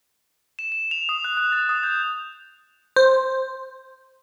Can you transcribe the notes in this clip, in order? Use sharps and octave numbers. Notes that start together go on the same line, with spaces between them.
E7
E7
F7
D#6
F#6
F#6
A6
D#6
G6
C5